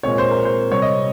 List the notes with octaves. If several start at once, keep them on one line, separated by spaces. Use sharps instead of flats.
A#2 G#3 C4 C#5
C5
A#4
C5
C3 G3 C4 C#5
D#5